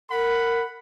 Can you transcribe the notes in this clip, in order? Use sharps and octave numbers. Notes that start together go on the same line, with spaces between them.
A#4 F#5 B5